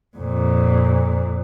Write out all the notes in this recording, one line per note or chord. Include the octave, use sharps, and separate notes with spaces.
F2 A#2